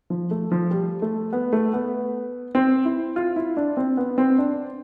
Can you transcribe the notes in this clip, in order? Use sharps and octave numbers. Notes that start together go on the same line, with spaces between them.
F3
A3
F3
G3
A3
B3
A3
B3
C4
E4
F4
E4
D4
C4
B3
C4
D4